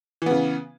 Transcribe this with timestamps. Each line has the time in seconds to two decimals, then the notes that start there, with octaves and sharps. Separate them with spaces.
0.22 E3
0.26 B3
0.31 C#3